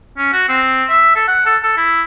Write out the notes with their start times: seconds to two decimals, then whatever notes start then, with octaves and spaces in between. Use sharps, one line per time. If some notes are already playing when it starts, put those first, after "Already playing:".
0.18 C#4
0.33 F#4
0.49 C4
0.89 E5
1.15 A4
1.28 F#5
1.46 A4
1.63 A4
1.77 E4